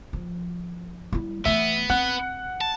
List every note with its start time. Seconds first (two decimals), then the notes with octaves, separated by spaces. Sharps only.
0.13 F3
1.12 G3 E4
1.45 E3 A3 B3 E5
1.90 C4 F#5 F#6
2.61 A5